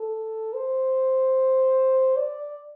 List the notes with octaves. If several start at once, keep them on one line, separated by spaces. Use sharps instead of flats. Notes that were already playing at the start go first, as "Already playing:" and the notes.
Already playing: A4
C5
D5